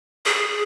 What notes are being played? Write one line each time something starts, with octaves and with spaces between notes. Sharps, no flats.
G#4